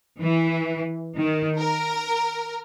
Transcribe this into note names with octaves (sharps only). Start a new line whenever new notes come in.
E3
D#3
A#4